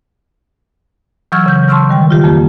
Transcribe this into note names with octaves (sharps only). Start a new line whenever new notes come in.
E3 F#3 C#6 E6 F6 G#6
C#3 G6
A5 C6 C#6 E6 F6
D#3 G3 G5
F4 G4
F2 A#3 G4